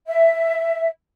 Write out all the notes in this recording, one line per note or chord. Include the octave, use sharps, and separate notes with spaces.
E5